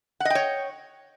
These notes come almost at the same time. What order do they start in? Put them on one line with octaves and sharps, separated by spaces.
F#5 D#5 G5 C#5